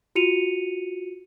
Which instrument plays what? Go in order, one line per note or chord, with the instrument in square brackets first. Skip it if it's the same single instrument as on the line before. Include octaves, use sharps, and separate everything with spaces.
[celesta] F4 F#4 C#7 D#7 F7